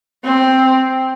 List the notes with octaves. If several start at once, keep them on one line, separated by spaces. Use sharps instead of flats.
C4